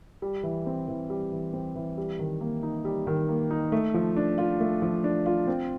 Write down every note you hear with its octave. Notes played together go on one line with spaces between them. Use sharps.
G3
E3
C4
E3
G3
E3
C4
E3
G3
D#3
A#3
D#4
G3
D#3
A#3
D#4
A3
F3
D4
F4
A3
F3
D4
F4
C4